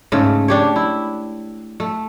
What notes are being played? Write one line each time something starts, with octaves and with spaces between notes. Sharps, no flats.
G#2 C#3 A3
D4 G4 C#5
E4
A3